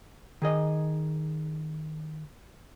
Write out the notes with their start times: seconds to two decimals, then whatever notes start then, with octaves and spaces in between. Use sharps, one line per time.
0.42 D#3 G#4 D#5